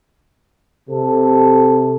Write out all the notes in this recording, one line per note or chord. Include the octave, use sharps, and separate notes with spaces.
C3 A4